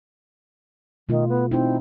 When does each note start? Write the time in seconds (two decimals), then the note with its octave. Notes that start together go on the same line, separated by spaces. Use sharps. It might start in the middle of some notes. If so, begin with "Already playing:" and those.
1.09 B2 D#3 A3 F4
1.29 B3
1.52 C4 D#4 E4